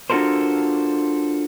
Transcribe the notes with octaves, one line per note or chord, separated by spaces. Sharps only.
D4 F4 F#4 A4 A#4 C5